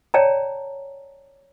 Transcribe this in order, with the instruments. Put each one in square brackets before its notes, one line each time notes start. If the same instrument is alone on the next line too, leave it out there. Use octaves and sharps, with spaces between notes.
[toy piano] C#5 D5 G5 A5 A#5